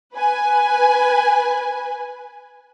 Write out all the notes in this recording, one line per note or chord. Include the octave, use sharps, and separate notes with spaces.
B4 G#5